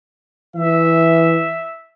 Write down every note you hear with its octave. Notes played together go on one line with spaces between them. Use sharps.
E3 E5